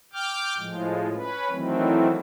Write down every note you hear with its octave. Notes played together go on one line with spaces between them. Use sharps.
G5 D6 F6 G6
A2 F3 G#3
C#4 B4
D#3 E3 F#3 A3 C4